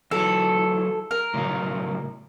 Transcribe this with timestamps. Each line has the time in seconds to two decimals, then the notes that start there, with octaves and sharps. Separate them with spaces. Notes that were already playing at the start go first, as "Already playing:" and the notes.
0.11 E3 F#3 A4
1.11 A#4
1.34 A2 C#3 F#3